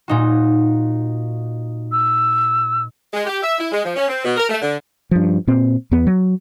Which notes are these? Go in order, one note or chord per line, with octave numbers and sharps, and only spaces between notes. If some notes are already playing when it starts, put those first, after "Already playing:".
A#2 D#4 F#4
E6
G#3
G4
E5
E4
G#3
F3
C#4
C4
B2
A#4
A3
D3
G2 F3
A#2 C4
E2 B3
F#3